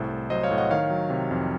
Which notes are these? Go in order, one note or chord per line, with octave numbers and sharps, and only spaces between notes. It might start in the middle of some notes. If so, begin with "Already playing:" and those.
Already playing: C2 A2 A4 C5
A2
F#3 C5 D#5
C#5 F5
A2
D#5 F#5
D#3 C#5 F5
F#3
C3
F2